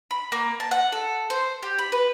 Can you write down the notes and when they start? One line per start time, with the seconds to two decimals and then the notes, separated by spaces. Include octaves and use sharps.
0.11 B5
0.32 A#3
0.60 A5
0.71 F#5
0.92 A4
1.30 C5
1.63 G4
1.78 B5
1.92 B4